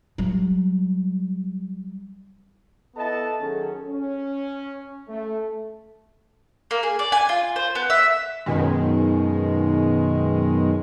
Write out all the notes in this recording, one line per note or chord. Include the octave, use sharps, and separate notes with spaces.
F#3 G3
B3 E4 A4 D#5 A5
D#3 F#3 C#4 G#4 A4
C#4
A3
A#3
G#4
D5
G#5
F4
C5
B3
E5
F#2 B2 D#3 G#3